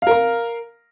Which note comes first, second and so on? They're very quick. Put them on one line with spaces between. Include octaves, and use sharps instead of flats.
F5 A#4 A#5